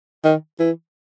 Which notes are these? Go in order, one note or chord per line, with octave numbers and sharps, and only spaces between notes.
D#3
E3